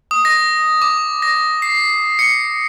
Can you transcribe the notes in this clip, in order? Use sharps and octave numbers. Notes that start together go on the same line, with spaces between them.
D#6
A#6
D6
A#6
C7
C#7